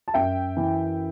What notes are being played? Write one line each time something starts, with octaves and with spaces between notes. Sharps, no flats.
A5
F#2 E5 G5
E3